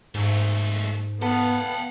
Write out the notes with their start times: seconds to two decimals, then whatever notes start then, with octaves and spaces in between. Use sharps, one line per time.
0.15 G#2 G#3 A3
1.22 B3 A4 B4 F5 F#5